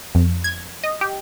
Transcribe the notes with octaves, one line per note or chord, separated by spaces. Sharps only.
F2
G#6
D#5
G4